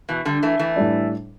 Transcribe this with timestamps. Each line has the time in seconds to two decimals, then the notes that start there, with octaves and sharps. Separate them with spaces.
0.09 B2 E3
0.25 D3 G3
0.43 E3 A3
0.59 E3 A3
0.76 A2 G3 D4